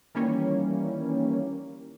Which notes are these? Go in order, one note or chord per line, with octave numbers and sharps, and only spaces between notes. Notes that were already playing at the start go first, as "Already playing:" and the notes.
D#3 E3 G3 A#3 C#4